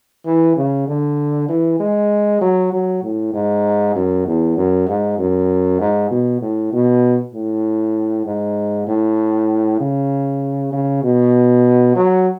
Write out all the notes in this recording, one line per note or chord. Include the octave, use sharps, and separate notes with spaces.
E3
C#3
D3
E3
G#3
F#3
F#3
A2
G#2
F#2
E2
F#2
G#2
F#2
G#2
B2
A2
B2
A2
G#2
A2
C#3
C#3
B2
F#3